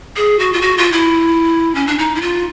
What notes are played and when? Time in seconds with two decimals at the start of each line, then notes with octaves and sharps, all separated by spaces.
0.17 G#4
0.39 F#4
0.53 F4
0.62 F#4
0.78 F4
0.92 E4
1.75 C#4
1.87 D4
1.98 D#4
2.15 E4
2.22 F4